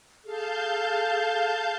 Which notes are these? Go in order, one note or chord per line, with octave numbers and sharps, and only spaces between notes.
G#4 A4 F5 A5 G6